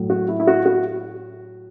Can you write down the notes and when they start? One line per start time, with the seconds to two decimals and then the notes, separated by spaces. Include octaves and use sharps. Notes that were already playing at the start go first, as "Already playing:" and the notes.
Already playing: A2 F#3
0.10 F#4
0.28 E4
0.40 E4
0.47 F#4
0.66 F#4